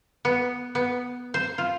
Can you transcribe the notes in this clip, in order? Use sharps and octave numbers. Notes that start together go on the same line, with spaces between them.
B3
B3
C5
F4